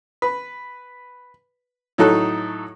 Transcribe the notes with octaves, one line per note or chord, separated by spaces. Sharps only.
B4
A2 F#3 D#4 A4 F#6